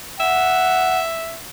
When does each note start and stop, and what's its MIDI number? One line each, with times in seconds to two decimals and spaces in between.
0.20 1.37 76
0.20 1.01 78